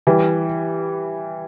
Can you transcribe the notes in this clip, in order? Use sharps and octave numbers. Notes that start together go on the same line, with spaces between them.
E3 G3